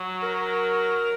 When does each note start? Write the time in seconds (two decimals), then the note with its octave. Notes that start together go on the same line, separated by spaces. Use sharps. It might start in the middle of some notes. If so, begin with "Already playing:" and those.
Already playing: F#3
0.23 A#4